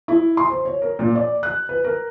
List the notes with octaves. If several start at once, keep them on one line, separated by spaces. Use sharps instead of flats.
E4
C6
C5
C#5
A#4
A#2
D5
F#6
B4
A#4